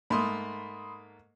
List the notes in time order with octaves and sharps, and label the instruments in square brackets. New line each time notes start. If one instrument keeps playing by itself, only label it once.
[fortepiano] G#2 A3 A#3 [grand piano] B5 C6 D#6